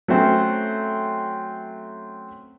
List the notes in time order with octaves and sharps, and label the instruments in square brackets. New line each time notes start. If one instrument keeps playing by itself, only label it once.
[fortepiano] F#3 A3 C4 C#4